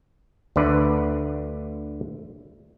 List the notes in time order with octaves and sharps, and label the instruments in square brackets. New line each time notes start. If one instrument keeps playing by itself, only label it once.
[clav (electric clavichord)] D2 D3 B4 D5